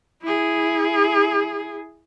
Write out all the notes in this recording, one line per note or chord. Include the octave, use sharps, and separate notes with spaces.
E4 G#4